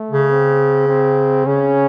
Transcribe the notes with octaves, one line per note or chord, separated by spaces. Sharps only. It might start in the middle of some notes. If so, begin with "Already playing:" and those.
Already playing: A3
C#3
C4
C4
C#3 C#4